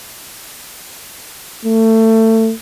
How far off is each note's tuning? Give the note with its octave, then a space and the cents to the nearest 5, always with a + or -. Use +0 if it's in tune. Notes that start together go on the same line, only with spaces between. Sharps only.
A3 +25